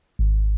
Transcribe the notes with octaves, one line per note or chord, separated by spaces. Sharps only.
G#1